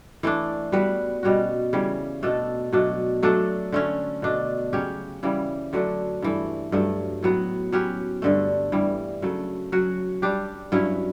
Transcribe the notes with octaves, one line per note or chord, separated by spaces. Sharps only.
E3 A3 D4
G3 B3 F#4 B4
B2 G3 C#4 F#4
C#3 E3 G3 C#4
B2 A3 D4 A4
B2 F#3 A3 D4
F#3 A3 D4 A4
D3 A3 C#4
B2 A3 D4
C#3 F#3 C#4 G4
C#3 E3 G3
D3 F#3 A3 D4
G2 E3 A3
G2 F#3 A3
A2 F#3 B3
F#3 C#4 G4 B4
G2 D3 A3
G2 E3 G3
C#3 F#3 A3
F#3 C#4 F#4
G3 D4 G4
G2 F#3 C#4 E4